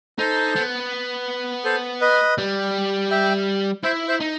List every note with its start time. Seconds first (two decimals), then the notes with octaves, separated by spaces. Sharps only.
0.19 D#4 A4 C5
0.56 B3
1.65 A4 C5
2.01 B4 D#5
2.38 G3
3.11 E5 G5
3.84 E4 C5 E5
4.08 C5 E5
4.20 D#4